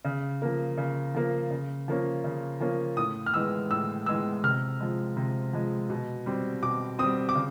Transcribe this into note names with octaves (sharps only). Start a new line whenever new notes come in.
C#3
F3 A#3
C#3
F3 A#3
C#3
F3 A#3 C#4
C#3
F3 A#3 C#4
A2 D#6
F6
E3 G#3 B3 E6
A2 E6
E3 G#3 B3 E6
C3 F6
F3 G#3
C3
F3 G#3
B2
G3 C4
B2 D6
G3 C4 D#6
D6
C#3